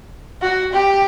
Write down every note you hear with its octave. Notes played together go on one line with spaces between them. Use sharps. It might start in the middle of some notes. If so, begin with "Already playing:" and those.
F#4
G4